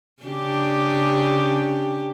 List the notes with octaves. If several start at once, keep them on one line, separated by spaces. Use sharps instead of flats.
C#3 D4 G4